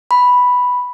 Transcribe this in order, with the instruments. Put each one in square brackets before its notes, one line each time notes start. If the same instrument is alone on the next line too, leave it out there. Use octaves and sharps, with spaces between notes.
[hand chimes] B5